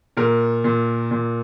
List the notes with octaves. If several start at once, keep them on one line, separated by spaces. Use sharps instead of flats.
A#2 A#4
A#2
A#2